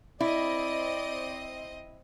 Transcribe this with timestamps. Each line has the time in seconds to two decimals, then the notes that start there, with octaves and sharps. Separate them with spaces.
0.20 C4 E4 D5 D#5